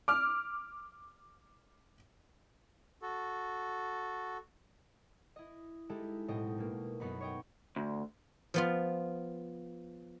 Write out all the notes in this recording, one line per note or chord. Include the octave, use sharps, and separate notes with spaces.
D6 F6
F#4 A4
E4 D#5
G#3 D#4 E4 G4 A4
B1 A2 C4 D#5 G5
B2 A#3
F#2 B3 D#4 B4 B5
C#5 D#5 G5
D2
F3 B3 F4